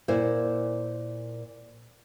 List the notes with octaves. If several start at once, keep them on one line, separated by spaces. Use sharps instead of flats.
A#2 E4 C5